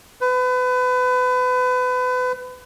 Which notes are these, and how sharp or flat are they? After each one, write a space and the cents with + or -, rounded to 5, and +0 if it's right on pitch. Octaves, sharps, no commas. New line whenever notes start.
B4 +30